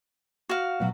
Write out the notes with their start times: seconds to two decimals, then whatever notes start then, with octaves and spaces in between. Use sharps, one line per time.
0.49 F#4 F5
0.80 B2 F#3